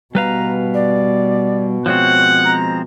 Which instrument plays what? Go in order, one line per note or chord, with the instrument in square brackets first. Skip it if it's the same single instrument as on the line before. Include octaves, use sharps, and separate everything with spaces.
[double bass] B2 [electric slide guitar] G3 B4 F5 [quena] A#5
[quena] D5
[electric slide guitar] F3 G#3 C4 [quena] C#5 [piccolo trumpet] F#5
[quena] A#5